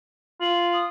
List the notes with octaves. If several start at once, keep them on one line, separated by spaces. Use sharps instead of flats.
F4 F#7
D#6